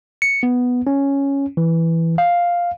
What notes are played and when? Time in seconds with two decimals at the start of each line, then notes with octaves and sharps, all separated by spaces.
0.22 C#7
0.43 B3
0.87 C#4
1.57 E3
2.18 F5